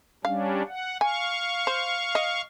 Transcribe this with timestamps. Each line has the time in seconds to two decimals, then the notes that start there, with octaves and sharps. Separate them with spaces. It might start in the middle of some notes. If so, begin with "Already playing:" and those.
0.25 G3 C#4 D4 F5
0.68 F#5
1.01 F5 G#5 C#6
1.67 C5
2.15 D#5